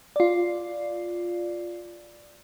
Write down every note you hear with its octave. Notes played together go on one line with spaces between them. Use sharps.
F4 D5